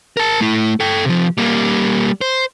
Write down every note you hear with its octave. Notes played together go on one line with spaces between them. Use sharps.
A#4 A5
A3 E4
A4 G5
C3 F3
G3 A#3
C5